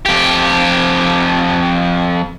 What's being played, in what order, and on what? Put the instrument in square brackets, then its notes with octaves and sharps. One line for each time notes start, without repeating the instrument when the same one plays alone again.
[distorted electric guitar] F2 G4